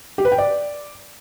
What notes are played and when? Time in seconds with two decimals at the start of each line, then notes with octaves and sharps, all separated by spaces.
0.18 G4
0.25 B4
0.32 G5
0.38 D5